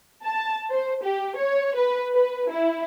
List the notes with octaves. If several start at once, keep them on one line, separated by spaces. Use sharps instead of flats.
A5
C5
G4
C#5
B4
B4
E4